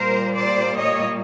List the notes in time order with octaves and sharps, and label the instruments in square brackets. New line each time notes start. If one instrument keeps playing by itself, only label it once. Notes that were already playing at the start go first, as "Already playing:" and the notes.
Already playing: [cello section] A#2 G3 A#3 A#4 C5
C5 D5
C#5 D#5